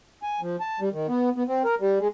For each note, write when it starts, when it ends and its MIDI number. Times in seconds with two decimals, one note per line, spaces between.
0.23 0.40 80
0.41 0.56 53
0.60 0.80 81
0.80 0.89 55
0.92 1.07 51
1.08 1.30 59
1.36 1.43 59
1.48 1.62 60
1.65 1.75 70
1.80 1.99 55
1.99 2.08 56